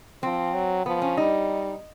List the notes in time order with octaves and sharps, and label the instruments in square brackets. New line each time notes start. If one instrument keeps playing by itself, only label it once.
[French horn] F3 [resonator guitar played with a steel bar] C4
[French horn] F#3
[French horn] F3 [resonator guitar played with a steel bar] B3
[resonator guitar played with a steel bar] C#4
[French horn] G3 [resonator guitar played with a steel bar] D#4